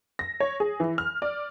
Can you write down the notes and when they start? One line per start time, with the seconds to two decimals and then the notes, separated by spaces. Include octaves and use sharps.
0.19 A#6
0.40 C#5
0.60 G#4
0.80 E3
0.98 F6
1.22 D5